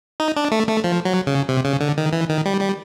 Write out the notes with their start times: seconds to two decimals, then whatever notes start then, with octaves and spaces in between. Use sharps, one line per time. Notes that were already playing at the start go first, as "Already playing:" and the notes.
0.20 D#4
0.36 D4
0.51 A3
0.69 A3
0.84 F3
1.05 F#3
1.27 C#3
1.49 C3
1.65 C#3
1.80 D3
1.98 D#3
2.13 E3
2.29 D#3
2.45 G3
2.61 G3